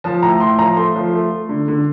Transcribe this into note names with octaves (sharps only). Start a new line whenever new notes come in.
F3 A5
A2 A#5
A2 C6
F3 A#5
A3 C6
F3
A3
A3
D3
D3